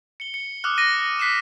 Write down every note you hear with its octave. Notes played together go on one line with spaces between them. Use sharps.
C#7 G7
C#7
D6 D#6 F6 F#6
D6 A#6 D#7
A#6
F#6 B6 C7 D#7 E7